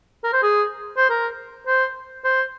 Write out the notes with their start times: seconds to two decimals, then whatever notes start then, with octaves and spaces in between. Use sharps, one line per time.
0.24 A#4
0.33 C5
0.43 G#4
0.97 C5
1.10 A#4
1.67 C5
2.24 C5